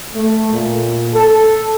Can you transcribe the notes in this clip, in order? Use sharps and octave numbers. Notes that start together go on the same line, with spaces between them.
A3
A#2
A4